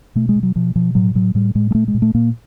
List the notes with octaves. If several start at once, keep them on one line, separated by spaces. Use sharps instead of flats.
B2 A3
G#3
B2
F#3
B2 F3
B2 F3
A2 F#3
A2 F#3
A2 G3
A2 G#3
G#3
A#2 A3
G#3
A#2
A3
A#2 A#3